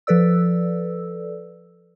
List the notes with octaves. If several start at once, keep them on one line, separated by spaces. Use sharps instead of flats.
F3 A4 B4 D5 E6